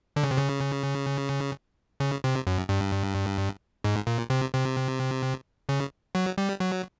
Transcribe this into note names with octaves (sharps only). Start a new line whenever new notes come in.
D3
C#3
C3
C#3
C#3
C3
F#2
G2
G#2
A#2
C3
C3
C#3
F#3
G3
F#3